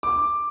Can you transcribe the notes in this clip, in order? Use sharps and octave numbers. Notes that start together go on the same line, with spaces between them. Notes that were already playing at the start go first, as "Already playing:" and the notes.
D6